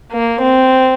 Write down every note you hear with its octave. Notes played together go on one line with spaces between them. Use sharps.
A#3
C4